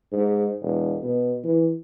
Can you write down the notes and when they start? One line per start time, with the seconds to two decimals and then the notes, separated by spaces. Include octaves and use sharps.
0.12 G#2
0.62 E1
1.03 B2
1.44 E3